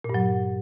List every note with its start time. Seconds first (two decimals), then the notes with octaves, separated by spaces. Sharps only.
0.04 A#2
0.09 G2
0.14 F#3